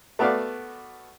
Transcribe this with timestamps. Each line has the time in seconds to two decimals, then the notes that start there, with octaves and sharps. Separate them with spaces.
0.19 A3 B3 F#4 D5 F5